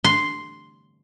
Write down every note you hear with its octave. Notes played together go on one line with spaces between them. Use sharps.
C6